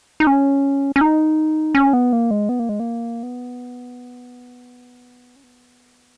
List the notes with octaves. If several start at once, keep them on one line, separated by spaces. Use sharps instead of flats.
D#4
C#4
C#4
D#4
C#4
B3
A#3
G#3
B3
A#3
G#3
A#3
B3
C#4
B3